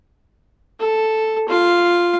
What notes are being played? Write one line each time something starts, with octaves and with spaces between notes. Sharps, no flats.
A4
F4 F5